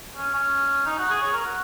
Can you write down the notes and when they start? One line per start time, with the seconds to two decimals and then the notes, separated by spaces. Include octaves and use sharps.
0.17 C#4
0.34 C#4
0.86 D#4
0.98 F#4
1.10 G#4
1.22 C#5
1.33 A#4
1.45 F#4